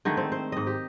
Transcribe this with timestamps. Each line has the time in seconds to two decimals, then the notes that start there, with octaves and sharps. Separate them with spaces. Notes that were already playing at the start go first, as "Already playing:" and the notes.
0.05 D3 D#3 G#3 A3
0.17 C4
0.32 C5
0.52 G#2 D#5
0.67 G4